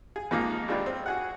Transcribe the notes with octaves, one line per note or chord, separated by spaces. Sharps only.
G#4
F2 G#2 F3 A#3 D#4 F4
G#1 G#3 D4 F4 G4 B4
C4
F#4 G#4 F#5